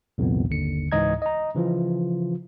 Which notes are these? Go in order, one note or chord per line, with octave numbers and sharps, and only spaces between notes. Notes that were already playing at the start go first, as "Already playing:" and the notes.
C2 F2 A#2 D#3 B3
G1 D#2 D3 C#7
C#2 G#2 E3 D#5 A#5 G#6
D#5 A#5
C#3 E3 F3 F4